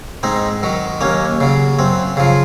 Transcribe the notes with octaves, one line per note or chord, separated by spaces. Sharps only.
G#2 C4 D#4
D#3 F#3
D#2 A#3 C#4
C#3 F#3
F#2 C4
C#3 F3